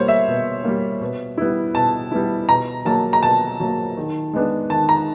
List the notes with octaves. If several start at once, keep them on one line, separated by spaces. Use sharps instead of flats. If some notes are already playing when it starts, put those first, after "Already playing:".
Already playing: B2 G3 A#3 C5 C#5
E5
B2
G3 A#3
B2
G3 B3 E4
B2 A5
G3 B3 E4
B2 A#5
F#3 A#3 A5
A#5
B2 A5
F#3 A#3
D#3
G#3 B3 D4
D#3 A5
A#5